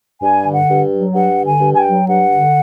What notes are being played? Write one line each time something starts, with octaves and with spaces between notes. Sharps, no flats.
G2 G#5
D3
F#5
G2
F#3
G2 F#5
D3
G#5
G2
G#5
G5
F#3
G2 F#5
D3